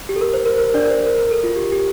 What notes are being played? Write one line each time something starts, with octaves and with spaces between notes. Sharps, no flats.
G4
A4
A#4
C5
A#4
A#4
D4 D5
A#4
C5
A#4
A#4
A4
F4
G4
G4